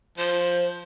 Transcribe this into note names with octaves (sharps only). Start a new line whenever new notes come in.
F3 C5